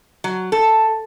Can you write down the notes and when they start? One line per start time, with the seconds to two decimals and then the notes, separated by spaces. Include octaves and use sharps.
0.24 F#3
0.52 A4